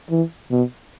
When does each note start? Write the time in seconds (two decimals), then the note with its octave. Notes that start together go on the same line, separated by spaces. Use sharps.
0.10 E3
0.51 B2